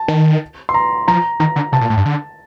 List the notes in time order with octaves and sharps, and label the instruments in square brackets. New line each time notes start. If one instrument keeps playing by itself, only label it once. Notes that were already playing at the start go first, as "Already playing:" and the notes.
Already playing: [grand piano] A5
[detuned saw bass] D#3
[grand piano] C6
A#5
[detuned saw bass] F3 [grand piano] A#5
[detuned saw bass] D#3 [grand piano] A#5
[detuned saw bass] D3
[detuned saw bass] C3 [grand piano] A5
[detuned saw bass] A#2
A2
G2
D3